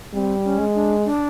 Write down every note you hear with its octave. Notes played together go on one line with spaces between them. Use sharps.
G3 C4
C#4
G#3
D4
D4